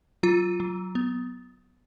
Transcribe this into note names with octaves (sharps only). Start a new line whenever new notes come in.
F#3 F4
F#3
B3